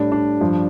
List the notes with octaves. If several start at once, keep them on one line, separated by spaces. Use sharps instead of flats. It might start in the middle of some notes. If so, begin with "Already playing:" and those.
Already playing: A2 G3 D4
D4
G2 F3